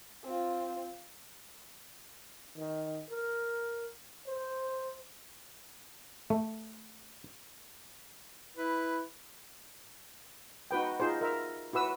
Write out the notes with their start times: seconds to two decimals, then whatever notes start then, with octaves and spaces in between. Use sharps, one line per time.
0.24 C4 F4
2.57 D#3
3.10 A#4
4.27 C5
6.30 A3
8.57 E4 B4
10.71 D#4 F#4 B4 G5
11.00 D#4 F4 G#4 C5
11.21 A#4 E5
11.73 E4 F#4 B4 E6